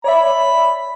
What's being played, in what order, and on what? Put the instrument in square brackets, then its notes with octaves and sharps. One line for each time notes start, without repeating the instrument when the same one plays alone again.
[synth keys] C#5 D5 E5 [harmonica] B5